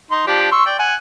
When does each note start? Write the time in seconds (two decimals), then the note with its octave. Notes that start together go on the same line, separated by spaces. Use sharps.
0.11 D#4 C6
0.27 F3 D4 G4
0.52 C6 C#6 E6
0.66 D5 G5
0.79 F#5 G#5